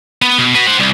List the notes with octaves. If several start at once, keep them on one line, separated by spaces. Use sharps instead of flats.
B3
B2
F#4 B4
C5 F#5
C2